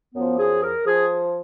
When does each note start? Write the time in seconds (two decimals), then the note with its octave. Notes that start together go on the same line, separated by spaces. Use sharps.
0.15 F#2 F3 B3
0.38 G#4
0.63 A#4
0.85 F3 G#4